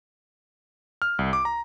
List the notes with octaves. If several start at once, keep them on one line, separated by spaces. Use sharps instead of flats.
F6
C2
D6
A#5